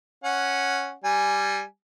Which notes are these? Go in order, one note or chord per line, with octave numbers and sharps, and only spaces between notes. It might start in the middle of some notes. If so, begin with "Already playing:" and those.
C#4 F#5
G3 G#5